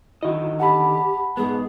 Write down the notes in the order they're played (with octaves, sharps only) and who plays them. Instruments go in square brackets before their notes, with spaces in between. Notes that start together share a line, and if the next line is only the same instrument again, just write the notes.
[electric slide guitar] D3 D#3 D#5 [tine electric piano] E4 F#4
[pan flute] G4 [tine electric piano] F#5 A5 B5
[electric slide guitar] G#2 B3 [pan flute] G#4